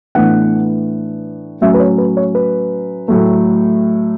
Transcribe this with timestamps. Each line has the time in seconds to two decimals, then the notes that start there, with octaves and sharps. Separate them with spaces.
0.15 A2 E3 B3 D4 F#5
1.61 A2 F#3 C#4 E5
1.74 B4
1.80 C#5
1.98 B4
2.17 C#5
2.35 B4
3.08 A2 F#3 A3